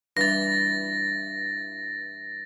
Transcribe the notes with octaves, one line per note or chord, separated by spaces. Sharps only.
G2 E3 A6 A#6